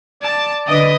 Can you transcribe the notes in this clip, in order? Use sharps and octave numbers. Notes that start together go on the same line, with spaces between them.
D5 A5
D3 B4 D#5